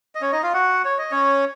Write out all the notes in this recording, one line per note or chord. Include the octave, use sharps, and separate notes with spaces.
D#5
C#4 C#5
D#4 D#5
F4 F5
F#4 F#5
C#5
D#5
C#4 C#5